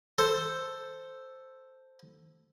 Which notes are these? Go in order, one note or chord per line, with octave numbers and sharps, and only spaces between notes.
A4 C5